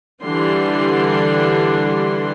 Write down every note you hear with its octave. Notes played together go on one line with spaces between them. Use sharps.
D3 E3 G3 D4 C6